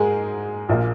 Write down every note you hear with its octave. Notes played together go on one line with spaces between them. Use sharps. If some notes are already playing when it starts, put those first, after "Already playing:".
Already playing: G#2 G#3 G#4 A#4
A#1 A#2 A#3